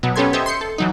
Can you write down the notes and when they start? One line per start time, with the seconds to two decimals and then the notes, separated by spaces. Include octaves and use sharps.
0.03 B2 F#3
0.16 B3 C#4 G4 A4 C6 G#6
0.33 G4 A4 C5 D#5 E5
0.46 C6 G6 C#7
0.61 A4
0.78 E3 F#3 D#4